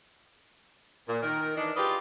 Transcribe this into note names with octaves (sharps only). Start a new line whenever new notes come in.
A#2
D#3 A#4
E3 D4 D#4
F4 G4 G#4 B4 D5 D#5